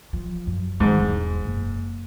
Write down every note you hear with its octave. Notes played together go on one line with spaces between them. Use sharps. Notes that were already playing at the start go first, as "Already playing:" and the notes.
F3
F#2
G#2 D#3
E1
F#1